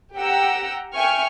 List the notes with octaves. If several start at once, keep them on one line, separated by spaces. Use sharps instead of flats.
G4 F#5 G5 A#5 E6
E5 G5 G#5 C#6 F6